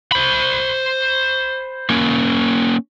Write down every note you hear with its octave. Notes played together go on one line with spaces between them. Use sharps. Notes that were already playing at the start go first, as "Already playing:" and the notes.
C5 B5
A#3 C#4